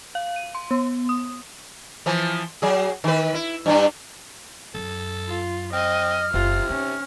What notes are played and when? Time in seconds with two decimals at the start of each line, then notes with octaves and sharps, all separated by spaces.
0.15 F5
0.36 D#7
0.55 C6
0.71 B3
1.09 D#6
2.06 E3 F3
2.62 F#3 G#4
3.04 D#3 B4
3.34 E4
3.66 G2 G3 D4
4.75 F#2 A4
5.28 F4
5.73 C4 D#5 F6
6.34 F#1 C3 F4
6.70 C#4 D#4